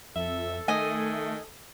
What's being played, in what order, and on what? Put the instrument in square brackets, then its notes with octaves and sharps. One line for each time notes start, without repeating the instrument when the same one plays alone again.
[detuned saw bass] F2 [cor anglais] A4 [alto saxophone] E5
[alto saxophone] D#3 [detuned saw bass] A3 [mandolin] D#5 G#5